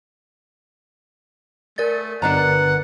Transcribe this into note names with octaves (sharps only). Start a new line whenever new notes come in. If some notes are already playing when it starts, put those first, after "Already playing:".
A3 A#4 D5 A6
G1 D4 B4 F#5 A#5